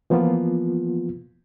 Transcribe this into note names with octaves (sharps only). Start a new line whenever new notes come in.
E3 F3 A#3 B3 F4